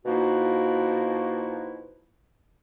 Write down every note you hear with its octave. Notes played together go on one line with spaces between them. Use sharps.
B2 F3 A#3 D#4 E4 F#4